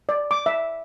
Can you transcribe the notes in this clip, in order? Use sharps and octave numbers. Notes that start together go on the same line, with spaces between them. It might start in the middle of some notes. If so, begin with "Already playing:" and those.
D5
D6
E5